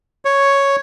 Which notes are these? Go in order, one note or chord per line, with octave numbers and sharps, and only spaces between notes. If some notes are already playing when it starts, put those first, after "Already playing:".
C#5